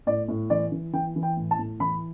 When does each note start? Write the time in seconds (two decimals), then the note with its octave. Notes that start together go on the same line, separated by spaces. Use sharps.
0.07 A2 D5
0.28 A2
0.50 E3 D5
0.72 E3
0.93 E3 G5
1.16 E3
1.23 G5
1.37 A2
1.51 A5
1.59 A2
1.80 E3 B5